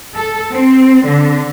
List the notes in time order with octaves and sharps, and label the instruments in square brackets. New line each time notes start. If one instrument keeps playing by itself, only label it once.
[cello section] A4
C4
D3